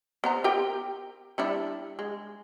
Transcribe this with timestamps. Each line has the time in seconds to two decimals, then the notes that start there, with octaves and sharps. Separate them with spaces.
0.24 B3 C5 A#5
0.44 G4 A#4 G5
1.38 G3 D4 E4
1.99 G#3